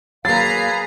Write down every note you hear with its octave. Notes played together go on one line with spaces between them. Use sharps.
F#3 A#3 G#4 B4 F5 A#5 A6 C7